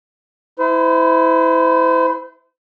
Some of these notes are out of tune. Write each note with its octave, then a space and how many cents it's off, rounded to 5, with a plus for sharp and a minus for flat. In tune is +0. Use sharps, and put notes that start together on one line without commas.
E4 -10 C5 -35